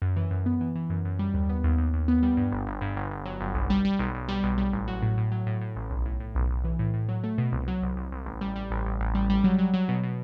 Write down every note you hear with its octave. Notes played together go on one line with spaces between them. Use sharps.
F#2
E3
F#2
B3
E3
E3
F#2
F#2
G3
D#2
B3
D#2
D#2
D#2
B3
G3
G2
G1
G1
G2
G1
G1
F#3
G1
B1
G3
G3
B1
B1
G3
B1
G3
A1
F#3
A2
A2
F#3
A2
A2
A1
B1
A2
A2
B1
B1
E3
A2
A2
F#3
A3
B2
C2
F#3
C2
C2
C2
A1
G3
G3
A1
A1
A1
G3
G3
F#3
F#3
F#3
B2
B2